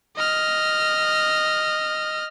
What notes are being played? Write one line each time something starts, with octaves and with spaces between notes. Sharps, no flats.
D#5 F6